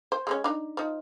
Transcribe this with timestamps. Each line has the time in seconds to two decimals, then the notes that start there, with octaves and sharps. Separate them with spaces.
0.12 C5
0.27 G#3 A3 C#4
0.44 D4 D#4
0.77 F3 D#4